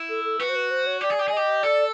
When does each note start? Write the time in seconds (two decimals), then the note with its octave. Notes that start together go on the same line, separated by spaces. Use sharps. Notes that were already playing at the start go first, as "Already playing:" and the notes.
Already playing: E4
0.09 A4
0.24 A4
0.39 F#4 B4
0.49 C5
0.55 B4
0.71 C5
0.87 C#5
1.01 G4 D5
1.10 G#4
1.19 G4
1.28 G#4
1.33 G4 D#5
1.63 A4 D5